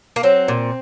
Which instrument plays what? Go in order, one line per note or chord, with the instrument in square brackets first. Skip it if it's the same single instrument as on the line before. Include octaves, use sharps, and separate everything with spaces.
[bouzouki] A#3
F#3 C4
A#2